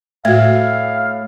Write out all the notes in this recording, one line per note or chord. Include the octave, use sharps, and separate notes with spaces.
A2 A3 F#4 E5 F5 G#6